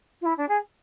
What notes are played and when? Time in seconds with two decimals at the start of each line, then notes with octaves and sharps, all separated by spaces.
0.21 F4
0.25 E4
0.37 D4
0.48 G#4